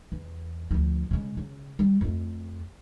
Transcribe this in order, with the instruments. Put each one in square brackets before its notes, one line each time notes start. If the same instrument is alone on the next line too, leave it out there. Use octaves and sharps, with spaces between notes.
[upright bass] E2
D2 F3
C#3 G#3
C#3
G3
F2 A3